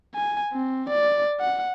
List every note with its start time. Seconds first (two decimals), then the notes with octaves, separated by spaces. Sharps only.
0.15 G#5
0.53 C4
0.89 D5
1.40 F#5